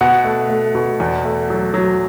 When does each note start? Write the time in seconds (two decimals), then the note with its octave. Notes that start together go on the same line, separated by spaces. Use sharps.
0.01 B2 F#5
0.25 A3
0.49 A3
0.75 B2
1.00 E2
1.25 A3
1.50 F#3
1.74 F#3